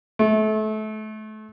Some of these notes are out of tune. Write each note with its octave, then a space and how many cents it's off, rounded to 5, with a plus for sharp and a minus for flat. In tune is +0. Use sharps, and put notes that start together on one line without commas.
A3 -30